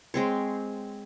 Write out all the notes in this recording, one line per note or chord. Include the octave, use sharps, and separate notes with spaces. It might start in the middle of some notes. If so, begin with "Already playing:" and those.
G#3 C4 C#5